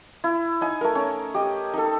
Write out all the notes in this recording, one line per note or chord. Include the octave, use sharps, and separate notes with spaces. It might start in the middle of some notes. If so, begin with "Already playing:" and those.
E4
D#4 G#5
A3 A#4
C#4
G4 D#5
D#4 A4